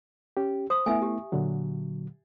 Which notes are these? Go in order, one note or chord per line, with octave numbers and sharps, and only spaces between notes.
C#4 G4
C5 D#6
A3 B3 E4 E5 G#5
G4
A#2 D3 F#3